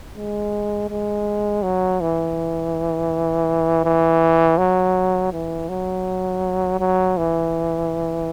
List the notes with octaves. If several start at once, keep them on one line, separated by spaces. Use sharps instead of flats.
G#3
G#3
F#3
E3
E3
F#3
E3
F#3
F#3
E3